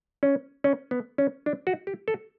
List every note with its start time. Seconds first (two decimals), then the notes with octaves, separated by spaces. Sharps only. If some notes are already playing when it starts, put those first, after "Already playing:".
0.23 C#4
0.64 C#4
0.91 B3
1.18 C#4
1.46 D4
1.67 F#4
1.87 G4
2.08 A4